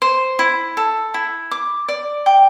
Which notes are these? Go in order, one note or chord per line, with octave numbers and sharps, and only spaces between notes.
C5
E4
A4
E4
D6
D5
G5